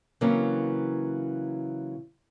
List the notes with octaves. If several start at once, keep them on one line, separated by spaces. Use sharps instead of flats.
C#3 E3 F#3 A#3 C4